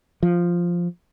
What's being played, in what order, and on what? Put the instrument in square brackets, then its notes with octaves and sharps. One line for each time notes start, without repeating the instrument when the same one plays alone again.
[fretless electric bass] F3